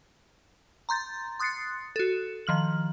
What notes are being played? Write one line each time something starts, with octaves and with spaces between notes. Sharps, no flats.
A#5 C6 G6 A6
C6 D#6 F#6 A6 C7 C#7
F#4 A4
D#3 F3 F6 F#7